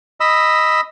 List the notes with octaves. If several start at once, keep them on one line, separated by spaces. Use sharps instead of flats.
D#5 B5 E6